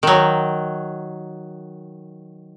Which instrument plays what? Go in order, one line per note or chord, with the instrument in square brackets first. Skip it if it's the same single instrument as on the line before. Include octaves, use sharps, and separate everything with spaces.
[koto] D#3 F#3